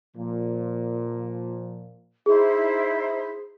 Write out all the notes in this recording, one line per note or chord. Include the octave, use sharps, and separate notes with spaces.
A#2 F3
D#4 E4 G#4 C5